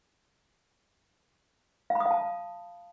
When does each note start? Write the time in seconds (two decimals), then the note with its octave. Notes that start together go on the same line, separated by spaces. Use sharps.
1.90 F5
1.95 B5
2.00 D#6
2.06 F5
2.11 A5